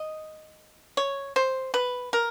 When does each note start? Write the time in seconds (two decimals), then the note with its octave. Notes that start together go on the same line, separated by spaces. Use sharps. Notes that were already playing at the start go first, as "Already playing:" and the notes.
Already playing: D#5
0.97 C#5
1.36 C5
1.74 B4
2.13 A#4